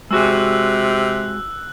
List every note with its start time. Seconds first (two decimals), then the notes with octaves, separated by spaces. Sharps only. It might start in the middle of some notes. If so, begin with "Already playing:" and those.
0.11 C3 G#3 F#4 G#4 E6 F#6